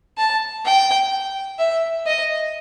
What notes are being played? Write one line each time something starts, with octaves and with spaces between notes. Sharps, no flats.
A5
G5
E5
D#5